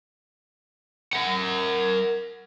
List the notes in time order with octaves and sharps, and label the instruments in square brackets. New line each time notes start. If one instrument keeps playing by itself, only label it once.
[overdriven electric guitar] A#4 F#5